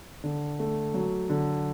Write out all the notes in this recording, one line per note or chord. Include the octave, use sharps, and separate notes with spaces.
D3
A3
F#3
D3